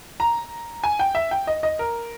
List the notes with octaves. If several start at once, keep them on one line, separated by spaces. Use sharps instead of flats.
A#5
G#5
G5
E5
G5
D#5
D#5
A#4